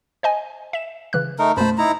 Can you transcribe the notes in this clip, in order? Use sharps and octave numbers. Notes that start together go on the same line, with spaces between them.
C5 D#5 G#5
E5 E7
C#3 E3 F#6
A3 D#4 A#4
F#2 B2 A3 C5 A5 B5
D#4 E4 A#5